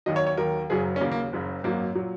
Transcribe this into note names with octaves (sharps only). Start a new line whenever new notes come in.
D#2 D#3 F#3 D#5
C#5
C#5
D#2 D#3 F#3 A#4
F#1 F#2 C#3 F#3 G#4
C#4
D#2 C#3 F#3 A#3
A#3
F#1 F#2 C#3
G#1 F#2 F#3 A#3
A#2 F#3